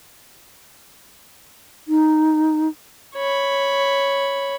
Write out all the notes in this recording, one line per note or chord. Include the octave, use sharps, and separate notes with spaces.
D#4
C#5 B5